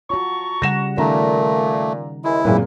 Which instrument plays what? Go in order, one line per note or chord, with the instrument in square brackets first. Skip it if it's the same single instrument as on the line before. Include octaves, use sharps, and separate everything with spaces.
[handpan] F4 F#4 [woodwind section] A5 A#5 C#6
[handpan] C#3 G3 F#5 [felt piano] A#6 E7
[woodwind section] A#2 [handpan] D#3 C#4 D#4 [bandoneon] A3 [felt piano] A#5
[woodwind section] D#2 G#3 [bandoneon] E4
[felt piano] F#2 A#2 G#3 [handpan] C4 A#4 [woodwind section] C#4 G4 B4